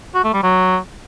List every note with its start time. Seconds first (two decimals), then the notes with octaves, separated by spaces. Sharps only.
0.15 F#4
0.24 A3
0.34 G3
0.43 F#3